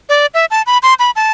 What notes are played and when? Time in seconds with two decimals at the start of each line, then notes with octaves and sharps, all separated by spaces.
0.09 D5
0.34 E5
0.51 A5
0.67 B5
0.83 C6
0.99 B5
1.16 A5